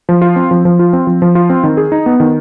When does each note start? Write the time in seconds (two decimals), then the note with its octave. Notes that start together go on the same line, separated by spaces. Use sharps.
0.09 F3
0.22 F4
0.36 C4
0.51 F3
0.65 F3
0.79 F4
0.93 C4
1.07 F3
1.22 F3
1.35 F4
1.50 C4
1.63 D#3
1.77 G#4
1.92 D#4
2.06 B3
2.20 D#3